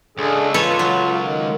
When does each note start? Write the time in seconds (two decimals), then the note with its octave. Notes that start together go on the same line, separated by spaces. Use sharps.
0.18 C#2 D4 G#4 A4
0.54 F4 A4 B4 C#5
0.79 F#3
1.18 D#3